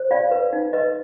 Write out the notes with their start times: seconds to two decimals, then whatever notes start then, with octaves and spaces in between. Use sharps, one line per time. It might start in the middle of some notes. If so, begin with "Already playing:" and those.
Already playing: C5
0.11 F4 D5 F5
0.31 B4
0.53 D#4
0.73 B4 D#5